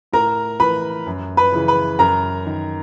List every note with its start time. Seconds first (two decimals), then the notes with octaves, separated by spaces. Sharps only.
0.13 A2 A#4 A#5
0.60 E3 B4 B5
1.07 F#2
1.37 B4 B5
1.52 C#3 E3
1.68 B4 B5
1.99 F#2 A#4 A#5
2.46 D#3